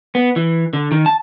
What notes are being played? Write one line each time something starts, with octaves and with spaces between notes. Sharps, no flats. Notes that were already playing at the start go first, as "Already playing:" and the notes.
B3
E3
D3
D#3
A5